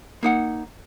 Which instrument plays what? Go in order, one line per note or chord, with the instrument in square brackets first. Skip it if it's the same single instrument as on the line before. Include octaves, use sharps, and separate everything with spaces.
[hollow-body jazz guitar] A#3 D#4 F#5